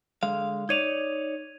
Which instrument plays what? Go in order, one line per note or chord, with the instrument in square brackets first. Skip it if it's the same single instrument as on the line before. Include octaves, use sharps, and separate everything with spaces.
[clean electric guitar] D3 G#3 F5
[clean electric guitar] D#4 C#5 D5 [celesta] G#6 D#7 F7